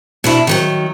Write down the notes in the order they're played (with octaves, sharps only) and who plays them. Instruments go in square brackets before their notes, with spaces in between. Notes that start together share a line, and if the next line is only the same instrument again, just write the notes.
[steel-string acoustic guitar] B2 D4 E4
D#3 E3 F#3